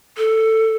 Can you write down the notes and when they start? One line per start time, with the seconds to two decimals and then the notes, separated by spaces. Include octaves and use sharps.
0.18 A4